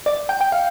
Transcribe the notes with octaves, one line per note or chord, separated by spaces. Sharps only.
D5
G5
G5
F5